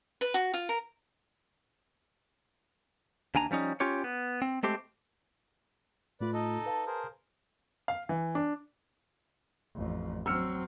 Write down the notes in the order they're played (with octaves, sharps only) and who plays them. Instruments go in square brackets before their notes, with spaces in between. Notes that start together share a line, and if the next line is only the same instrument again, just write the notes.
[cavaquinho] B4
F#4
F4
A#4
[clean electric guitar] D#2 D4 G#5 A#5
F3 G3 C#4 D#4
C#4 F4 G4 C#5
B3
C4
G#3 A3 C4 G4
[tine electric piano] A2 A3 F4 [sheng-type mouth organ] B4 D5
[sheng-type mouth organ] D#4 A4 D#5
[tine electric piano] B4 F5 A5
[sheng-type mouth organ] G#4 A#4 C5
[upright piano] F5
E3
D4
[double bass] A1 F2
[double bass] F#3 C4 [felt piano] E6 F6 C#7